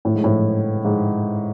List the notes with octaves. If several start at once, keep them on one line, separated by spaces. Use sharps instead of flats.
A2
G#2
A2
G#2